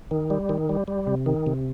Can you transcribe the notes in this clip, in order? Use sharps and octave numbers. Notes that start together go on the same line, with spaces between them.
D#3
G3
D#3
G3
G3
C3
D#3
C3